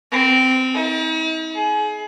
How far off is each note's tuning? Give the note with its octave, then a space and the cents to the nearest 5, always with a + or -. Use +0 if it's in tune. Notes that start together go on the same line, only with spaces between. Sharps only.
C4 -15
D#4 +45
G#4 +30